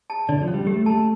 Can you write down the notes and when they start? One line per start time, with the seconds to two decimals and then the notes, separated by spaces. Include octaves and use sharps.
0.10 A5
0.29 D3 D5
0.42 F3
0.48 C#4
0.54 G3
0.67 A3 G4
0.86 A3 A5